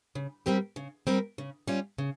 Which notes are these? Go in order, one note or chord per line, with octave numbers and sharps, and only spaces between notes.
C#3
G3 C4 G4 A#4
C#3
G3 C4 G4 A#4
C#3
G3 C#4 F4
C#3